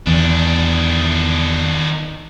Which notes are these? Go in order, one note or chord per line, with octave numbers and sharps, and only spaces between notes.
E2 D#3 D4